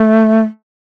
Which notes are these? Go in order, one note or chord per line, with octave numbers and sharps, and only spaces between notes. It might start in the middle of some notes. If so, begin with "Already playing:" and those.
Already playing: A3